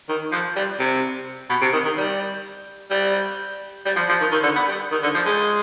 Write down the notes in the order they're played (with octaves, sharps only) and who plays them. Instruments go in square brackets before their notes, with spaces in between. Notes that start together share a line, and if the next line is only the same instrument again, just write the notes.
[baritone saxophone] D#3
F3
G3
C3
B2
C3
D#3
D#3
G3
G3
G3
F3
F3
D#3
D#3
D3
B3
G3
D#3
D3
F3
G#3